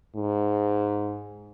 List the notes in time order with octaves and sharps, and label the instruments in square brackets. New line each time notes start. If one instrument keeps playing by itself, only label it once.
[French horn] G#2